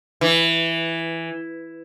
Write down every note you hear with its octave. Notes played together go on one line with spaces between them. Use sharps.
E3